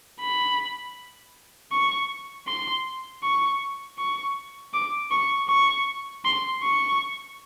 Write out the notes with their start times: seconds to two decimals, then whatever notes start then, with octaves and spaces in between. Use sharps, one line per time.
0.20 B5
1.72 C#6
2.47 C6
3.23 C#6
3.98 C#6
4.74 D6
5.11 C#6
5.49 C#6
6.25 C6
6.63 C#6